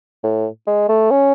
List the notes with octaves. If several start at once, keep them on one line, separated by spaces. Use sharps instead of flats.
A2
G#3
A3
C#4